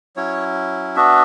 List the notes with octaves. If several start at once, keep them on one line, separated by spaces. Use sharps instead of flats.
F#3 C#4 E4 C#5
B3 D4 F#4 E5